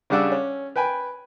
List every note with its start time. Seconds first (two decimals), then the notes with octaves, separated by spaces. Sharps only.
0.10 C#3 G3 D4 F#5 D6 E6
0.32 C#4
0.76 B4 G5 G#5 B5